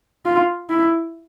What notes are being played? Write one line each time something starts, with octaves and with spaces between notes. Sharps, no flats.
F4
E4